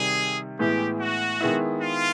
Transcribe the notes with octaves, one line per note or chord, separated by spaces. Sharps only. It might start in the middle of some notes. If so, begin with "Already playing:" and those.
Already playing: C3 D#3 G3 G#4
A2 E3 G#3 B3 G4
F#4
D#3 G#3 B3 E4
F4